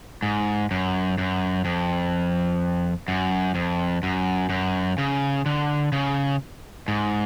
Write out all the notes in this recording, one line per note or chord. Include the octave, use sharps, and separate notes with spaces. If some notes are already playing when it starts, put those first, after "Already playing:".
G#2
F#2
F#2
F2
F#2
F2
F#2
F#2
C#3
D3
C#3
G#2